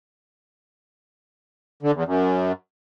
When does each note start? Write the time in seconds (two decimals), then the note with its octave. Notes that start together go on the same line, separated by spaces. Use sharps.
1.83 D3
1.95 E2
2.06 F#2